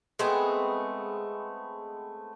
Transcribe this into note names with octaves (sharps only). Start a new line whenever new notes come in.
G#3 A3 B3 C4